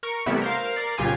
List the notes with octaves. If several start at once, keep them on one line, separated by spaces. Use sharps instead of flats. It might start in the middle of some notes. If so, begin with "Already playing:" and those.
A#4 C#6
C3 E3 G3 A3 B3 E4
A#4 C5 F5
A#4 D5 C7
C2 A#2 C#3 F4 G4 G#5